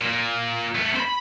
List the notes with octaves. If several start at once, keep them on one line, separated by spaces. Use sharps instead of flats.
A#2
A3 B3
C5 B5